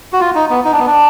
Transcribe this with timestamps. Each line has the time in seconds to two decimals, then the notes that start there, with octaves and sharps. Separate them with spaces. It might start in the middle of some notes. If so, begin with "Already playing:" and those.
0.13 F#4
0.20 F4
0.35 D#4
0.50 B3
0.65 D#4
0.72 D4
0.79 B3
0.86 D4